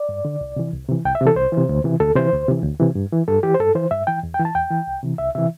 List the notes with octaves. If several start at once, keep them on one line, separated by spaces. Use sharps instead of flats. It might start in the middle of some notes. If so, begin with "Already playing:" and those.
Already playing: D5
G2
D3
C2
C3 E3
C2
C3 E3
C2 G5
E5
C3
E3 A4
C2 C5
C3 E3
D2
C3 E3
D2 A4
C3 E3 C5
D2
C3 E3
D2
C3 E3
G2
E3
G2 A4
E3 G4
C5
G2 A4
E3 C5
G2 E5
E3 G5
E2
G5
E3
A5
E2 G5
E3
C2
C3 E3
C2 E5
C3 E3 E5